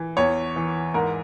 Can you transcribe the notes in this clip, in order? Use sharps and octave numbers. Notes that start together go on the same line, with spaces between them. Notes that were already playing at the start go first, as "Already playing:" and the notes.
Already playing: E3
E2 C#5
E3
G#2 A#4